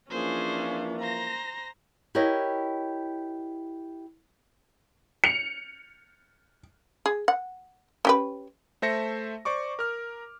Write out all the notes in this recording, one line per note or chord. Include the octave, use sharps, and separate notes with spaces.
E3 F3 A#3 C#4 D4 G#4 C5
C5 A#5 A#6
E4 G4 A#4 C#5 D#5 F5
C#7 F7
G#4
F#5
C#4 G4 B4
A3 C5 E5 A5 A#6 C#7
C5 D5 C#6 D6
A#4 F6